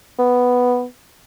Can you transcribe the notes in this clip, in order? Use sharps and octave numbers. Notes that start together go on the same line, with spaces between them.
B3